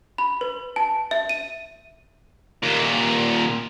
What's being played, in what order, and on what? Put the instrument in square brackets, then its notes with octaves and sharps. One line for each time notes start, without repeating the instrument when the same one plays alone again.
[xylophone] B5
B4
A5
E5
D#7
[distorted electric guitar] D#2 A#2